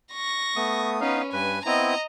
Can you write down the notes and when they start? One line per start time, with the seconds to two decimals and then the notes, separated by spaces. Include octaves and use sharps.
0.13 C#6 A#6
0.56 A3 B3 D#6
1.01 B3 C#4 D#4 B4 F5
1.33 G2 B4 G#5
1.66 B3 C4 E4 D#5 A#5